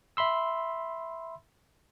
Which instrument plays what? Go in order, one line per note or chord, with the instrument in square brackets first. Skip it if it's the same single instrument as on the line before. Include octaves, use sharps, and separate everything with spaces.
[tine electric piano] E5 B5 C6 E6